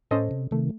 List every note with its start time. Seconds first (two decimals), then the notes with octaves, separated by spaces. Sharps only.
0.11 A2 C#4 A4 C5 D#5
0.31 C3
0.51 C3 D#3 A3